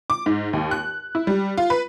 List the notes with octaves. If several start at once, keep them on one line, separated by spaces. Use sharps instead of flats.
D6
G#2
D#2
F#6
E4
G3
F4
B4